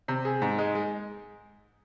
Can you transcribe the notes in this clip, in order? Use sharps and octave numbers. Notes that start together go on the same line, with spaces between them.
C3
G#4
G#2
G#3
G#3